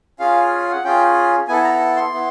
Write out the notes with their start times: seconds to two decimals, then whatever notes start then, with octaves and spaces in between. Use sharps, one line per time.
0.20 C#4 F4 G#4 F5
0.72 F#5
0.84 C#4 F4 G#4 G5
1.48 B3 E4 A4 G#5
1.64 A#5
1.96 C6
2.12 B3 E4